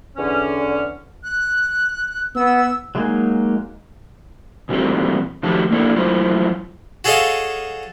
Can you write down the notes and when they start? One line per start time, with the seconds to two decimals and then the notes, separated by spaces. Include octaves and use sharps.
0.17 E2 D3 C#4
1.24 F#6
2.36 B3 E6
2.95 F#3 G#3 A#3 D#4 G#5
4.69 A#2 E3 G3 C4 F#4 A4
5.43 D#3 F3 A3 F#4 G4 A5
5.71 A#3 D4 E4 A4
5.96 F#3 A3 E4 F4 C5
7.04 F#4 G#4 A4 C#5 D#5 F5